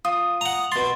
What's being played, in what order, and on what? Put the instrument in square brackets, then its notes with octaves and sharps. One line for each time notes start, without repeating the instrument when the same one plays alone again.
[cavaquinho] F4 [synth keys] D#6
[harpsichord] F#5 A#5
[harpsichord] B2 C6 [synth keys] A6